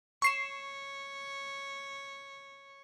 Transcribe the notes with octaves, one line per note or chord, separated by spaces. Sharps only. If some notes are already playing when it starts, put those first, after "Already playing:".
C#5 C#6 C7 E7